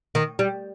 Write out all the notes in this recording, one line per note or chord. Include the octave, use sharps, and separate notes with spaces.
D#3
G3